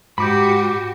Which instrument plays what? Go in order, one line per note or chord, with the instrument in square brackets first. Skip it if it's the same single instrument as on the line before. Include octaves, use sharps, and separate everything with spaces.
[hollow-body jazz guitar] G#2 [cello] F#4 G4 [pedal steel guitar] B5 D6 G6